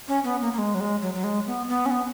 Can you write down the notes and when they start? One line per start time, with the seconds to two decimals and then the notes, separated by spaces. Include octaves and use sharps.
0.08 C#4
0.24 B3
0.41 A#3
0.53 A#3
0.58 G#3
0.74 F#3
0.80 G#3
1.02 F#3
1.14 F#3
1.24 G#3
1.47 B3
1.68 B3
1.86 C#4
1.91 B3